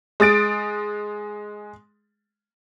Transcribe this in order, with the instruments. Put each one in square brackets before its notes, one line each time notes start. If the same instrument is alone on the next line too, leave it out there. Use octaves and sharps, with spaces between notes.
[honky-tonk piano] G#3 D#6 A6 D7